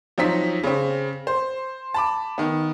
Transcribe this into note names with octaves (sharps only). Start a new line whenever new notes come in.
F3 F#3 C4 D#4 B6
C#3 C4
C5
A5 B5 D6
D#3 B3